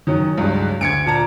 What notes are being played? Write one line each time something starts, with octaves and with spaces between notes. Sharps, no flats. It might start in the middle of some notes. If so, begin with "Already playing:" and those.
D#3 F#3 C#4
C#2 G2 F#3 G#3
D2 G#6 C#7 D7
A#2 A5 A#5